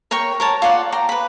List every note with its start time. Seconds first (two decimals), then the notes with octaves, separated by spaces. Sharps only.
0.11 A#4 C#5 G5 C#6
0.40 A#4 C#5 A5
0.62 F4 C#5 D5 F#5
0.92 G5 A#5
1.09 B4 B5